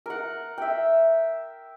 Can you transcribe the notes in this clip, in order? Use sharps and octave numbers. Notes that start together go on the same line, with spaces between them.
A#4 F#5
E5 G5